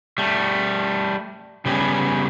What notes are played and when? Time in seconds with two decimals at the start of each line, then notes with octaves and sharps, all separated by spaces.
0.18 G3 A3
1.65 C#3 G3 B3 G4 G#4